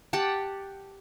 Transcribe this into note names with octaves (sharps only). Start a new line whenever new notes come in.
G4 F#5 G5 A5